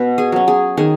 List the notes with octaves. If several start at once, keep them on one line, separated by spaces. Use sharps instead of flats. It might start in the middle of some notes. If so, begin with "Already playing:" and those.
Already playing: B2 B4
G#4
F#3 C#4
G#4
D#3 G#4